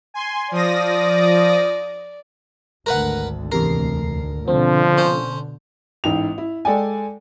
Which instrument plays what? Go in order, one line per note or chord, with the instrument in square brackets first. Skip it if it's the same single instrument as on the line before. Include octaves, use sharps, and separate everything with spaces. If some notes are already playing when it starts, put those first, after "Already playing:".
[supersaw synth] G#5 C6
[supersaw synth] F3 D#6 A#6 [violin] D5
[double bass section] G#1 D2 [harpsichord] A#4 B4 F#5
[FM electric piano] E2 C3 C7 [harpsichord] A#4
[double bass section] B2 D3 [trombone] F3 [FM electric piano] C4
[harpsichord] C#4 C5
[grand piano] A1 G#2 E4 G5 F7
E4
G#3 A4 D5 G5 G#5